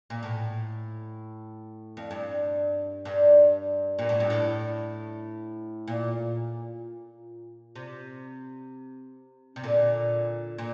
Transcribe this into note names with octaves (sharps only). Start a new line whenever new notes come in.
A#2
A2
F2
G2
G2
A#2
A2
G2
A2
A#2
C3
C3
A#2 D3
A#2